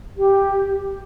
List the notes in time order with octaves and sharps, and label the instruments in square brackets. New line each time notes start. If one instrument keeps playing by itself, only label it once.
[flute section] G4